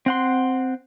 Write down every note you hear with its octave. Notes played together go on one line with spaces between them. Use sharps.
C4 F#5 C6